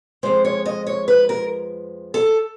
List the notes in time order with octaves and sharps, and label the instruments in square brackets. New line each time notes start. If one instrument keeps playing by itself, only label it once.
[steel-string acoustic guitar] F2 C3 F3 G#3 C5
C#5
D#5
C#5
B4
A#4
A4